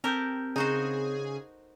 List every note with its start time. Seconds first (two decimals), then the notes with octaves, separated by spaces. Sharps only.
0.04 C4 G4 A4 A#4 G6
0.56 C#3 D#4 F#4 G#4 C5